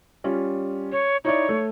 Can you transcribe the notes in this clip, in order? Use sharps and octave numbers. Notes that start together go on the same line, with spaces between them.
G3 C#4 F4
C#5
D#4 E4 C#5 D5
A3